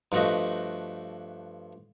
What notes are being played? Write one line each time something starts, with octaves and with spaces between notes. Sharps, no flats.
G2 F3 A3 F#4 D#5